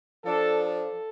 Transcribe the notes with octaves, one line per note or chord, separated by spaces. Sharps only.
F3 D4 A4
A4